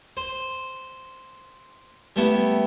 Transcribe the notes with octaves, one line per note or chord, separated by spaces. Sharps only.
C5
G3 A3 B3 E4